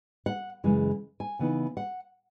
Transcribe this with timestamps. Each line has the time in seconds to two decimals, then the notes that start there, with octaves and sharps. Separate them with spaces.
0.26 F#5
0.64 F#2 C#3 E3 G#3
1.20 G#5
1.39 C#3 E3 B3 D#4
1.77 F#5